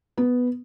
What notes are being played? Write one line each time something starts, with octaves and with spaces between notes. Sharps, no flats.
B3